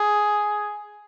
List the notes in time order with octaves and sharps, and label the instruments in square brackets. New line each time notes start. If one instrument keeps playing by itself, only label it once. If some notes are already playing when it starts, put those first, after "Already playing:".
Already playing: [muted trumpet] G#4